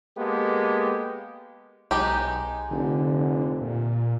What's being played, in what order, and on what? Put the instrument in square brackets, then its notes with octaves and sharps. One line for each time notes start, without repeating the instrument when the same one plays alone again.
[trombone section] G#3 A#3 B3 G4 A4
[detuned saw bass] B1 [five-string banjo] G#3 D#4 G4
[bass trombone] F1 [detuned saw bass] D3
[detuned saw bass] A#2